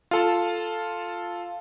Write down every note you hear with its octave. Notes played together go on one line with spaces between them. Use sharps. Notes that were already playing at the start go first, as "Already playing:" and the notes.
F4 A4 A5